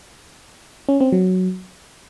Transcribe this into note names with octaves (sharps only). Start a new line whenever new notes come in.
C#4
C4
F#3